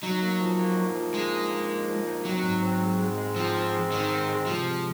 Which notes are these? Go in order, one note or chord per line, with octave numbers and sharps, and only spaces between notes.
F#3 D#4
A#3
F3
A#3
D#4
F3
G#3 A#3
D#4
A#3
A#3
F3
D#4
F#3 C4
G#2
C4
G#3
G#3
G#3
F3 C4
C4
G#3
D#3 C4
C4
G#3
C3 F3
G#3